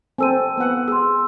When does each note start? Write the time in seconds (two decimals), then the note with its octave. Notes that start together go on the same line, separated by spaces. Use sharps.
0.18 C4 A4 C5 G#5 E6 D#7
0.58 B3 F#5
0.88 G#4 C6 E6